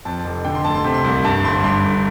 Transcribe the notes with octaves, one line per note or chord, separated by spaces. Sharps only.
F2 A5
F1
D3 G5
C6
D2 A5
C6
C3
C6
C2
G2 A5
G1 C6
G2 C6
G1